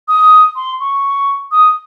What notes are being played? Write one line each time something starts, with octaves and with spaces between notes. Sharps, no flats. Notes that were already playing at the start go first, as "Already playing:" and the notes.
D#6
C6
C#6
D#6